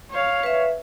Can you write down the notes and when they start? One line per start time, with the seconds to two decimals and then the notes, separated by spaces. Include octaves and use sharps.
0.11 C#5 F5
0.43 B4 E5